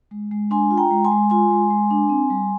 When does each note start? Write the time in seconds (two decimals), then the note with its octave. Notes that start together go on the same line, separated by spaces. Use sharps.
0.11 G#3
0.31 G#3
0.51 D4 G#5 C6
0.71 F4
0.77 G5 A#5
0.91 G#3
1.04 G#5 C6
1.11 G#3
1.30 F4 G#5 C6
1.51 G#3
1.70 G#3
1.91 D4
2.09 C4
2.30 G3